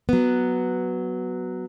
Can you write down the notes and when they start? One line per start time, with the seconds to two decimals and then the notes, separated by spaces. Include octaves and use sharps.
0.09 F#3 B3